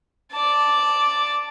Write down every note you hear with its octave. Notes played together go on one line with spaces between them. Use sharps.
D5 A5